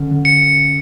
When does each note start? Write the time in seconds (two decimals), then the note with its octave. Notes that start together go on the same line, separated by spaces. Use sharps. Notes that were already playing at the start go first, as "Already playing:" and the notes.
Already playing: D3 C#4
0.11 D3
0.25 C#7